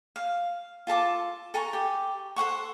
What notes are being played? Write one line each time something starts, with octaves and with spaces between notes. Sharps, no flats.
F5
F4 A4 A5 D6
A4 G#5 A#5 C#6
G4 G5
A4 C5 F#5 C#6